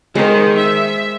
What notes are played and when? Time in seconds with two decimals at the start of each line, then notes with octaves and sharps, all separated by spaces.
0.15 D#3 G#3 C5
0.57 E5